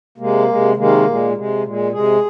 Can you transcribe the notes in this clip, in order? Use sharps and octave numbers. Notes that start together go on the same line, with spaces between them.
C3 G#3 A#3
C3 G#3
C3 D#3 G#3 A#3
A#2 G#3
C3 G#3
A#2 G#3
C3 G#3 G#4